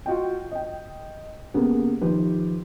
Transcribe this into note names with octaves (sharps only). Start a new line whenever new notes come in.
F4 F#4 D#5 G5
D#5 G5
C#3 A#3 B3 G4 G#4
D#3 F3 G4 B4